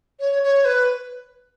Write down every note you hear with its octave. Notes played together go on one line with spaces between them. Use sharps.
C#5
C#5
B4